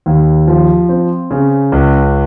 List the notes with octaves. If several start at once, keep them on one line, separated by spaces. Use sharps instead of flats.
D#2
F3
C4
C#3
C#2